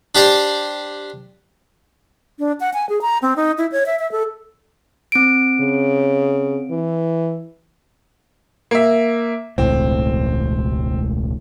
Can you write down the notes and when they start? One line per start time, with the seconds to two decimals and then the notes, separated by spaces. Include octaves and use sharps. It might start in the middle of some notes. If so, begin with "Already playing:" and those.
0.15 D4 G4 C5 D5
2.39 D4
2.60 F#5
2.74 G#5
2.89 G#4
3.02 A#5
3.22 C4
3.36 D#4
3.58 E4
3.72 C#5
3.86 E5
3.99 E5
4.12 A4
5.12 C4 D7
5.61 C#3
6.70 E3
8.71 A#3 E5
9.58 E1 C#2 A2 C4